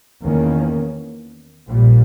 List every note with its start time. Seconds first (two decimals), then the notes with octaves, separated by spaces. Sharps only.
0.23 E2 D#3 A#3 C#4
1.69 A#1 A#2 G3